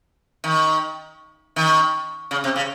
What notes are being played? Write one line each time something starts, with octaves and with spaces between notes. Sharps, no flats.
D#3
D#3
C#3
C3
C#3